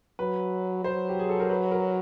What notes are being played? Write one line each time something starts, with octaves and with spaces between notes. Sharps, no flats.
F#3 B4
F#3 C5
G4
G#4
A4
A#4
B4
A#4